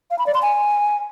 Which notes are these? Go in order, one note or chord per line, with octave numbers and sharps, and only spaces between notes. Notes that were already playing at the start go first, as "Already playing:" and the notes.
F5
B5
D5
C6
G#5